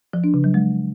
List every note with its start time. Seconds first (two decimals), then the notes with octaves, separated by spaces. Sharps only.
0.13 F3
0.24 D4
0.34 C#3
0.44 F#3
0.54 G#3